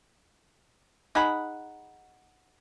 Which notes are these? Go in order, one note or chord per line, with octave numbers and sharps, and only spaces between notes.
D#4 G#4 F#5 B5